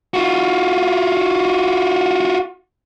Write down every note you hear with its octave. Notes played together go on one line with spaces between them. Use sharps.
F4 F#4